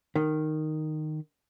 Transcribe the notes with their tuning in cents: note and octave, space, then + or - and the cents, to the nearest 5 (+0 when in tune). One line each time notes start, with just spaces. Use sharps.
D#3 -10